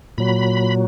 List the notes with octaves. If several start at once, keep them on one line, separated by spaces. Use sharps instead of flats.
A#2 F#3 B5